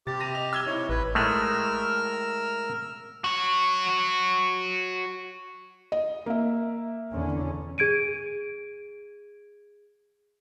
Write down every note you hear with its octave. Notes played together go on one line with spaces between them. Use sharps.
C3 G4 A6
A#6 D#7 F7
D#5 F7
E6 G#6 G7
C3 D#4 E4 C#5
A1 B4
A2 G#3 A3 A#4 E6 F6
F#4 C#5
D#5
A#3 E5
E2 D3 C#4
G#4 G#6 D7 D#7